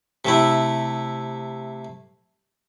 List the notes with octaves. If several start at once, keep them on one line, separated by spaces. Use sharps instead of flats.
C3 A3 E4